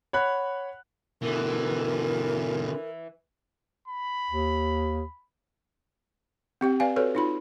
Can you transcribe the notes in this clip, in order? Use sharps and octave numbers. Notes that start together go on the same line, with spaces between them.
C#5 F#5 B5 F#6
B2 D3 E3 A#4
B5
D#2
C4 G4 G5
B4 D5 F5 G#5
F#4 A4 B4 C#5
D#4 F4 B5